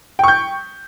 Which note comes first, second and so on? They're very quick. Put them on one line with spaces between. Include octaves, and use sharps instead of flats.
G5 C#6 G6